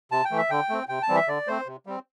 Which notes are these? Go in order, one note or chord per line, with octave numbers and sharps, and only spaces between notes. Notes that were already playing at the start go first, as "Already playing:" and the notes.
C3 A5
G5
E3 A3
E5
D3 G5
A3 C4
C3 G5
A5
E3 G3 C4
E5
D3 D5
A3 C4 C5
C3
G3 C4